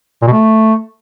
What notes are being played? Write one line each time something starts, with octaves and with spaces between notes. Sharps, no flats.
A#2
B2
A3